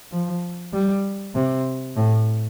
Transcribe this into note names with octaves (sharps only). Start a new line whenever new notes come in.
F3
G3
C3
A2